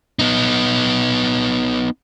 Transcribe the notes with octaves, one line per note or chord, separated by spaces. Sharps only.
B3 D#4